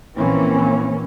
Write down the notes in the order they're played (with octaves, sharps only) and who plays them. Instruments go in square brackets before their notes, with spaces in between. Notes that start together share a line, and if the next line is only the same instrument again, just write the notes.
[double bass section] A#1 E3 A#3 C4 C#4